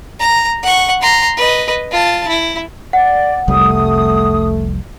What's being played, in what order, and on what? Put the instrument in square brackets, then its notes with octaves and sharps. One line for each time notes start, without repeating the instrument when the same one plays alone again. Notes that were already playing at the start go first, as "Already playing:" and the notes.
[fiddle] A#5
F#5 C#6
A#5 C6
B4 D#5
F4 A5
E4
[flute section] D5 [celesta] F#5
[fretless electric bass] F1 C2 G3 [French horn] A3 [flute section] D#6